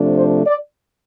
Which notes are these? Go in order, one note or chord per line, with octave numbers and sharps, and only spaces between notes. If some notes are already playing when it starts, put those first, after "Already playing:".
Already playing: C3 F3 A3 D4
C5
D5